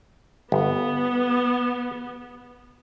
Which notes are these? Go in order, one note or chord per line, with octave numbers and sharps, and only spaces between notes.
G1 B3